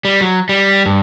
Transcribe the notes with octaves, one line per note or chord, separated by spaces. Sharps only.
G3
F#3
G3
G2